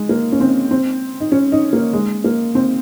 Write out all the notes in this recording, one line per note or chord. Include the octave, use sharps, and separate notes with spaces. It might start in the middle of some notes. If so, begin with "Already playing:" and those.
Already playing: G#3
A#3
C#4
C4
C4
D#4
C#4
D#4
A#3
G#3
A#3
C4